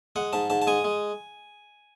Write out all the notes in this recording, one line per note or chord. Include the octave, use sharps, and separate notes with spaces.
G#3 F#5
G#2 A5
G#2 A5
A5
G#3 G#5
G#3